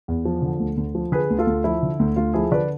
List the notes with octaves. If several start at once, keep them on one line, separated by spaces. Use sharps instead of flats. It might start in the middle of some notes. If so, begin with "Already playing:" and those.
E2
F3
D3
D2
D2
F3
D3 G#4 B4
D2
F4 A4
D2
F3 E4
D3
D2
D2 F4
F3 E4 G#4
D3 B4 D5